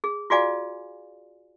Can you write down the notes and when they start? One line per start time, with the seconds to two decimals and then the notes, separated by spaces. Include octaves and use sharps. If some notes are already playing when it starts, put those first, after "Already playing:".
0.04 G#4
0.30 F4 F#4 G#4 D5 F5 G#5